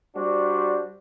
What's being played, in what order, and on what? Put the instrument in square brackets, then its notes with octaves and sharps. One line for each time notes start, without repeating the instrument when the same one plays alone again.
[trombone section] G3 D4 F#4 C5